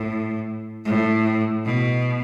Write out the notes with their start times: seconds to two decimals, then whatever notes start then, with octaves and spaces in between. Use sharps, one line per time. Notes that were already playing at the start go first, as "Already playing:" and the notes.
Already playing: A2
0.85 A2
1.65 B2